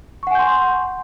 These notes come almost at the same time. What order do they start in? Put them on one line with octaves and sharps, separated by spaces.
C#6 F#5 G#5 G6 C6